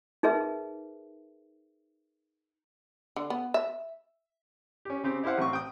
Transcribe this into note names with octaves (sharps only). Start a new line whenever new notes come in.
D#4 G#4 A#4 B4 E5
D3
B3
E5
C#4 G4
C#3 C4 G4
E4 G4 C5 F5 F#5
A1 C4 C#6
G5 D#6